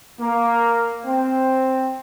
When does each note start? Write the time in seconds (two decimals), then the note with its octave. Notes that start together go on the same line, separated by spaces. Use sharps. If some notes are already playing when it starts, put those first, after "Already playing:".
0.19 A#3
1.05 C4